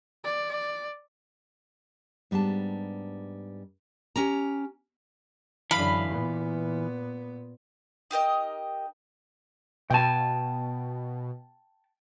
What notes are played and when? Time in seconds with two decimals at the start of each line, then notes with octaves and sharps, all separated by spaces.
0.24 D5
2.31 G#2 G3 B3 D4 A5
4.16 C#4 G4 A#5
5.71 F#2 D3 E3 F5 B5
6.09 A#2 B3
8.11 D#4 G4 A#4 D#5
9.90 B2 G5 A5